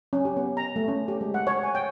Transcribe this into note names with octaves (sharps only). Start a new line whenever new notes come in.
C#4
G4
B3
A#5
A3
C#4
G4
G#3
F#5
C#5
G#5
G5